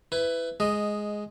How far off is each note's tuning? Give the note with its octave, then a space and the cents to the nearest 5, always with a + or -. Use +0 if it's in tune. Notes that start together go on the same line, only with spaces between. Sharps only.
E4 +5 B4 +20
G#3 +5 D#5 -5